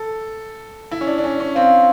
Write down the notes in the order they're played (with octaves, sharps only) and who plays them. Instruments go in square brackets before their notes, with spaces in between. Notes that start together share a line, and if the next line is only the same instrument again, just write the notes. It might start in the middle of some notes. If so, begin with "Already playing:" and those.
Already playing: [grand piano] A4
E4
C#4
D4
D4
C#4
C#4
[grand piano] C4 [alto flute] F5